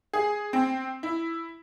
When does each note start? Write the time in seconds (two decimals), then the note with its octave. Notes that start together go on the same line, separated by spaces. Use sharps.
0.13 G#4
0.53 C4
1.03 E4